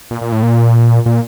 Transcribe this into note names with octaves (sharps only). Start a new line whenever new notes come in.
A#2
A#2
A2
A#2
A#2